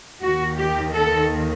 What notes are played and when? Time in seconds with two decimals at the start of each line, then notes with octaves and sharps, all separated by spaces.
0.21 D#2 D#3 F#4
0.58 G4
0.94 A4